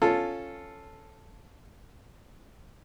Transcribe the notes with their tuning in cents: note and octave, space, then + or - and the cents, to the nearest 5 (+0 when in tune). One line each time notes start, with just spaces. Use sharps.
C#4 -5 F4 +0 A4 +0